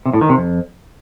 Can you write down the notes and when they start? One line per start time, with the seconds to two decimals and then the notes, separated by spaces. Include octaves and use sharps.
0.06 C3
0.13 A2
0.21 D#3
0.29 C3
0.37 F2